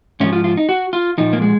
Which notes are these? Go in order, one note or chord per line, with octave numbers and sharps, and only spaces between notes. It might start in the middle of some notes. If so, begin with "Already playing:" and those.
G#2 F3 C#4
F4
F4
D#4
F#4
F4
A#2 F3 D#4
A#3
G#3